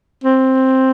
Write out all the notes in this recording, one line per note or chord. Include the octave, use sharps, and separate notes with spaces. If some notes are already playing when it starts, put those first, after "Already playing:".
C4